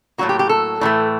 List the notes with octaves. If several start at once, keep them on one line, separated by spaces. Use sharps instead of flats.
A2 F#3 A#3 F#4
G4
G4
A4
A2 E3 A3